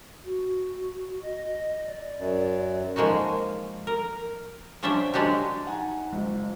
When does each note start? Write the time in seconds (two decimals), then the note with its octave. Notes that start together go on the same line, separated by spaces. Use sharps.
0.24 F#4
1.22 D#5
1.86 D5
2.19 F#2
2.96 F3 G#3 A#3 D#4 F#4
3.87 A#4
4.83 F3 C#4 D4 C5 E5 G5
5.14 F#3 G#3 D4 F#4 G4
5.67 D#4 F#5 G#5 A#5
6.13 F#1 G#3 F4